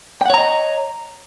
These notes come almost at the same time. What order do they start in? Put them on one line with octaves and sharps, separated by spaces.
G5 F#5 C#5 A#5 D#5